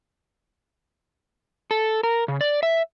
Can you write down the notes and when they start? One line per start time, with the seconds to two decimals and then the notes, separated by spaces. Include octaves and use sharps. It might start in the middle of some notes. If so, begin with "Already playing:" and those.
1.71 A4
2.03 A#4
2.28 C#3
2.41 D5
2.63 E5